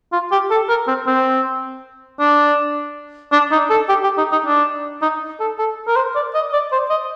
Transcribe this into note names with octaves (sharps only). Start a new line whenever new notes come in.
F4
G4
A4
A#4
C4
C4
D4
D4
D#4
A4
G4
G4
D#4
D#4
D4
D#4
A4
A4
A#4
C5
D5
D#5
D5
C5
D#5